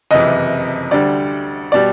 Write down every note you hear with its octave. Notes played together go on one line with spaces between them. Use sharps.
F#1 F2 C3 E3 D#5
D2 D3 G3 D5
B2 G3 D5